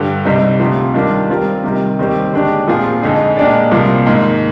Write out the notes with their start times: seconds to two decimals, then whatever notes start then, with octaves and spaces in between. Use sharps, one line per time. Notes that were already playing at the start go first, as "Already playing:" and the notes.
Already playing: G2 D3 G3
0.25 C2 C3 G3 C4 D#4
0.60 D2 C3 F3
0.94 D#3 G3 D4 F4
1.29 G3 C4 F4 A#4
1.64 C3 D#3 G3
1.99 D#2 D#3 G3 C4 G4
2.33 D#2 D3 G#3 D4 G4
2.67 A#2 F3 C4 F4 G#4
3.02 F2 D3 G#3 D#4 G#4
3.37 A#2 G#3 D4 G4 D5
3.71 C2 C3 F3 A#3
4.06 G#2 D#3 A#3